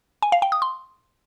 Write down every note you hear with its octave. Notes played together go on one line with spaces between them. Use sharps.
G#5
F5
G5
D#6
C6